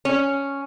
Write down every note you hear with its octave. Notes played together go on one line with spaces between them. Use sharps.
C#4